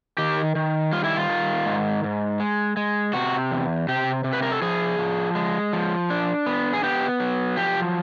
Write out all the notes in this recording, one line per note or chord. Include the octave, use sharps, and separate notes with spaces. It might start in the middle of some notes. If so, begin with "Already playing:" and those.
D#3 G4
D#3
G3 F4
E4
F4
D#3
G#2
G#2
G#3
G#3
C3 F#4
E2
C3 G4
C3
B4
A#4
A4
F3 G#4
F3
G#3
F3
D4
B3
G#4
B3 G4
F#3
F3 G4